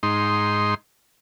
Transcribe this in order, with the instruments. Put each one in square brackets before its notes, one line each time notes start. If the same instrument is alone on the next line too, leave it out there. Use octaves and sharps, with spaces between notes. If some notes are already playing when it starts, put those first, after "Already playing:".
[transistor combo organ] G#2 D#4 C6